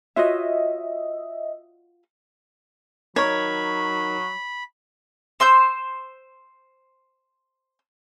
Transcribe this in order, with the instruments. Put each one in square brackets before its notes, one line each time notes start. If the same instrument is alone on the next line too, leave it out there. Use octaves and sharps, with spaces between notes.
[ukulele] F4 F#4 C#5 [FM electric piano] D#5 E5
[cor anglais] F#3 [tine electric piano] D#4 A#4 [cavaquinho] C#5 [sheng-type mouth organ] B5
[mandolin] C5 C6 E6 G6